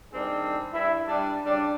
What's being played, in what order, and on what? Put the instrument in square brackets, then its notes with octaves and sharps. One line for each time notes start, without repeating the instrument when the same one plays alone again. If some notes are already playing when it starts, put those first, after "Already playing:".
[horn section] D#3 G3 C4 D4 G#4
G2 E4
G3 D4
C#3 G3 D4